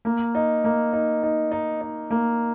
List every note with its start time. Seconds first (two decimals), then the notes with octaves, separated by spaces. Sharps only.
0.05 A#3
0.35 D#4
0.64 A#3
0.93 D#4
1.23 D#4
1.52 D#4
1.81 D#4
2.11 A#3